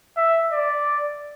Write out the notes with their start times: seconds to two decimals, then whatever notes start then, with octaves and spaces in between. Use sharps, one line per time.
0.17 E5
0.52 D5